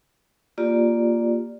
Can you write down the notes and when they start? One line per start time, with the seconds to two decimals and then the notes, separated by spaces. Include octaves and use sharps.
0.58 A#3 F4 G4 D5